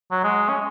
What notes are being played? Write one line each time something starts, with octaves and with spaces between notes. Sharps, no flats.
F#3
G#3
C#4